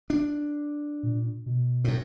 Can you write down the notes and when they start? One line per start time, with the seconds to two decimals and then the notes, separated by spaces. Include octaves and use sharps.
0.10 D4
1.03 A#2
1.46 B2
1.84 F#2 A2